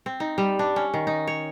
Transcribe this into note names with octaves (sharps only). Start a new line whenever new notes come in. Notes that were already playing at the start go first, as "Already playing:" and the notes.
C4
D#4
G3
D4
C#4
D#3
D#4
C#5